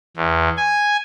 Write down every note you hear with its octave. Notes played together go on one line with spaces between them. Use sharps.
E2
G#5